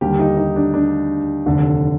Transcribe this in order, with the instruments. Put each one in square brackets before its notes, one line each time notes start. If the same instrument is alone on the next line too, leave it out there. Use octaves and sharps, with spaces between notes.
[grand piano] D#2 D3 G3 A#3 G4
D#4
D#4
D4
D4
F1 D#2 D3